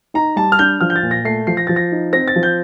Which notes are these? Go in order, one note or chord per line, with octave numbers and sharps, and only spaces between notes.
D#4 A#5
G3 A5
F6
D4 G6
F3 F6
G6
A6
A#2
A#6
A3 C7
F3 C7
A#6
F3 A6
A#6
D#4
C4 A#6
A6
F3
G6